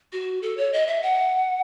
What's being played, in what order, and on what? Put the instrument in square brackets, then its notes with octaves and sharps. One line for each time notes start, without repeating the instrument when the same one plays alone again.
[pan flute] F#4
A4
C#5
D#5
E5
F#5